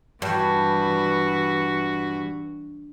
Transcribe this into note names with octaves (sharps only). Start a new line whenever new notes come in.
G2 E3 F#4